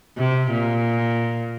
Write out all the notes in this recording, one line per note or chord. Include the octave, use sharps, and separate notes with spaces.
C3
A#2